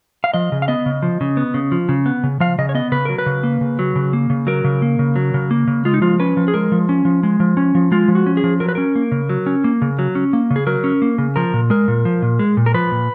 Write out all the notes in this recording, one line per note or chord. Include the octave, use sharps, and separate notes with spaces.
F5
F3 D#5
C#3
F5
B3 D#5
C#3
F3
C#3
B3
C#3
F3
C#3
B3
C#3
F3 F5
C#3 D#5
C#5
B3 D#5
C#3 B4
F#3 A#4
B4
C#3
A#3
C#3
F#3
C#3
A#3
C#3
F#3 A#4
C#3
A#3
C#3
F#3
C#3
A#3
C#3
G#3 F4
D#4
F3 F4
C#4 B4
F3
G#4
G#3 A#4
F3
C#4
F3
G#3
F3
C#4
F3
G#3 F4
F3
F#4
C#4
G#4
F3
F#3 A#4
B4
C#4 A#4
A#3
C#3
F#3
C#4
A#3
C#3
F#3
C#4
A#3
C#3
G#4
F#3 A#4
C#4
A#3
C#3
F3 A#4
A#2
G#3 A#4
A#2
F3
A#2
G#3
A#2
A#4
F3 B4
A#2